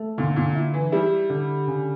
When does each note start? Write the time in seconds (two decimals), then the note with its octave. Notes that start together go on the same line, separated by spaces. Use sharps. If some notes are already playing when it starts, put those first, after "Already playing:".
Already playing: A3
0.18 A#2 D3
0.36 A#2
0.55 E4
0.74 E3
0.92 G3 E4
1.30 D3
1.67 C#3